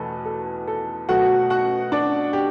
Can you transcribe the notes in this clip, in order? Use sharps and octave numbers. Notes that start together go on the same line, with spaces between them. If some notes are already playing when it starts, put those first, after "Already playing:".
Already playing: E2 B2 A3 A4 B4
A4
A4
B2 F#3 A3 F#4 F#5
F#4 F#5
D4 D5
G4